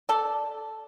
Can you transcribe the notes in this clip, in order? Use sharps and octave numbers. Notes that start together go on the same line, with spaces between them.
A4 D5